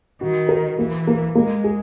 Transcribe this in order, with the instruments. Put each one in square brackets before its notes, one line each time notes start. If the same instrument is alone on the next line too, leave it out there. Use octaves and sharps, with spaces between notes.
[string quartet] D#3 [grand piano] F#4
[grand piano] A#4
[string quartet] E3 [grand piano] A#3
[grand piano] A#3
[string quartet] G#3 [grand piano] A#3
[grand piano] G#4